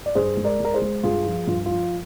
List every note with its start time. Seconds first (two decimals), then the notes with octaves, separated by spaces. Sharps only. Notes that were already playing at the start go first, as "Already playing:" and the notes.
0.06 D5
0.15 G2 G#4 C5
0.37 G#3
0.45 A#4 D5
0.60 G#3 A#4
0.74 G#4 C5
0.82 G#3
1.03 G2 F4 G#4
1.26 F3
1.47 G2 F4
1.66 F3 F4